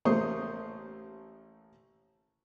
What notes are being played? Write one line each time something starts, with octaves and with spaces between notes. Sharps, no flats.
A1 A3 A#3 C5 C#6 D#6